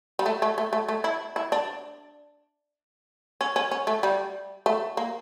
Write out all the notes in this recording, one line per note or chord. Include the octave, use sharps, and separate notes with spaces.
G3
A3
A3
A3
A3
A3
E4
E4
D4
C#4
C#4
C#4
A3
G3
A3
A#3